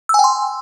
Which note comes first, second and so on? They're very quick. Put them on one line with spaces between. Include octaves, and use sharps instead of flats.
E6 G#5 G5 C6